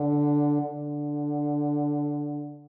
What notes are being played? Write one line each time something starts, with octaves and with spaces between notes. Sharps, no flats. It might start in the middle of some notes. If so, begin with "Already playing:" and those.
Already playing: D3
D3